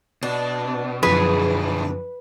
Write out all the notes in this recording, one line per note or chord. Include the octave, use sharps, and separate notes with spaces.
B2 D4
F#2 B2 D3 F3 G#4 B4